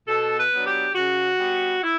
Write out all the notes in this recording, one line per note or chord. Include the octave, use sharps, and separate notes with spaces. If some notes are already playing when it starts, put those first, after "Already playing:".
B2 A4
B4
F#3 B3 D4
G4
C#3 F#4
G3 B3
E4